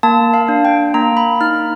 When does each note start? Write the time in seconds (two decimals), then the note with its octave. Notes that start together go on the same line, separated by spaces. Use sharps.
0.03 A#3 A5
0.34 F5
0.48 D4
0.65 G5
0.94 A#3 A#5
1.17 B5
1.41 D#4 F6